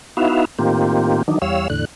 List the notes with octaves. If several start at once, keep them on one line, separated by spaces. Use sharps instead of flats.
B3 D#4 E4 F#4 E5 F5
A2 D#3 A#3 C4 F4 G4
D#3 E3 F#3 D4 D#4
E2 G3 C#5 F5 E6
E2 A2 D3 F#6